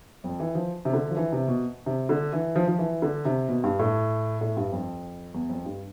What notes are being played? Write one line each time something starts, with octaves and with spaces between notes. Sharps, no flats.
F2
E3
F3
C3
D3
F3
E3
C3
B2
C3
D3
E3
F3
F3
E3
D3
C3
B2
G2
A2
A2
G2
F2
E2
F2
G2